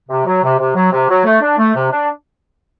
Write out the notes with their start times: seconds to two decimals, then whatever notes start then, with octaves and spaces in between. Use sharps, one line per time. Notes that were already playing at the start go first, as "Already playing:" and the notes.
0.09 C3
0.25 F#3
0.42 C3
0.58 C3
0.75 F#3
0.91 C3
1.08 F#3
1.24 A3
1.41 D4
1.57 A3
1.74 C3
1.91 D4